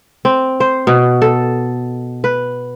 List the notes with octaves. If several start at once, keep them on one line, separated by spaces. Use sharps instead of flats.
C4
C5
B2
A4
B4